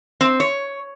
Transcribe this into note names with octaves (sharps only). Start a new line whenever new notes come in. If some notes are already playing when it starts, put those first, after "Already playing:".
C4
C#5